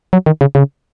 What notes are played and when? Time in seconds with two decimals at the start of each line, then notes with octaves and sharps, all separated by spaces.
0.13 F#3
0.26 D#3
0.41 C#3
0.55 C#3